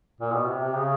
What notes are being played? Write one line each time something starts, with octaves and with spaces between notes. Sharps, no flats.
A#2
B2
C3
C3
C#3